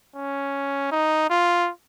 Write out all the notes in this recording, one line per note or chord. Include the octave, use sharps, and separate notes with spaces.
C#4
D#4
F4